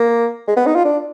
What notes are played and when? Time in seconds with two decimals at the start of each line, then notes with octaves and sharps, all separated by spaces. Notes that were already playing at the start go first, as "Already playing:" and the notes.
Already playing: A#3
0.48 G#3
0.57 B3
0.67 D#4
0.76 F4
0.85 D4